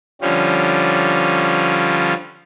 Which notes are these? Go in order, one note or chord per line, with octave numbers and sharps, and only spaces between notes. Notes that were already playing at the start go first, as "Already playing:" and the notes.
D3 F3 G3 C#4